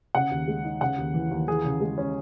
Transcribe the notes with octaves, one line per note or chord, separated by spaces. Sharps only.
C#3 F#5
D#2
G#3
D#4
C#3 F#5
D#2
E3
D#2
E3 G#4
C#3
G#3
C#4